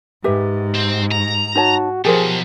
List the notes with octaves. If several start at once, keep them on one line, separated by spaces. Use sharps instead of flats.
G#2 G4 B4 E5
C4
A#5
D#4 F#4 C#5 A5
B2 F3 F#3 G4 G#4 A#4 C5